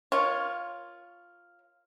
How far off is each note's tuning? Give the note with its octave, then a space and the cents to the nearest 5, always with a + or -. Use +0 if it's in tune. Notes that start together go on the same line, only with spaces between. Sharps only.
F4 +0 A#4 +25 C#5 +0